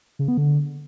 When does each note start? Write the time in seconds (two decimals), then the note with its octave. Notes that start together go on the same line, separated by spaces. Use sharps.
0.19 C#3
0.28 B3
0.37 D3